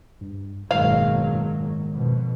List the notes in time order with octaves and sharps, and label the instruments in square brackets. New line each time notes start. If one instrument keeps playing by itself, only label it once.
[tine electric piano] G2
[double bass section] F#1 B2 F#3 [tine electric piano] G#2 D#3 G#3 [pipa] F5
[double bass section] F2 B2